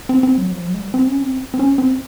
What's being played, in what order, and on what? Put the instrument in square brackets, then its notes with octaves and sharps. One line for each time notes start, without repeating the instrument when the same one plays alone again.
[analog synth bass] C4
C4
F#3
F3
F#3
G#3
G3
C4
C#4
C4
C4
C#4
C4